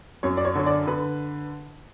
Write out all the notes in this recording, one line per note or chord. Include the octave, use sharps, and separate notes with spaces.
F#2 C#5
D5
C#5
D3 C#5
D5
D3 B4